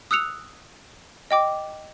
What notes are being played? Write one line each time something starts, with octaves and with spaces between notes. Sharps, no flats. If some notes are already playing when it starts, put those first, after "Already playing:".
D#6 E6 F#6 C#7 F7
D#5 G5 D6